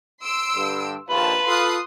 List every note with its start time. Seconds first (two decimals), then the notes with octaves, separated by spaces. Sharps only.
0.22 C6 E6 D7
0.55 G2 D3
1.10 A#1 D#2 F4 B4 A5
1.47 F4 A4 F5 C6 D#6 F#6